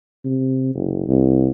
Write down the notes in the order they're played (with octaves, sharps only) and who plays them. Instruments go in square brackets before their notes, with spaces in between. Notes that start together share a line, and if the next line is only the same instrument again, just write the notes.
[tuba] C3
F#1
C2